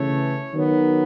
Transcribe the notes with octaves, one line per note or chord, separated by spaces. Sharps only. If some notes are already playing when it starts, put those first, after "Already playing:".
Already playing: C#3 E3 A3 C#5
D#3 F#3 B3